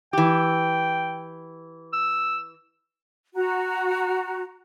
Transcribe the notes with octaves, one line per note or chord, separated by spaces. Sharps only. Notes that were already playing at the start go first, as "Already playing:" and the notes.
E3 G4 G5
E6
F#4 A#5